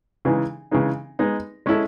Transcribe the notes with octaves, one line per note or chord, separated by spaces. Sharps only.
C#3 E3 G#3 D#4
C#3 E3 G#3 D#4
G#3 B3 D#4
G#3 C#4 E4 A4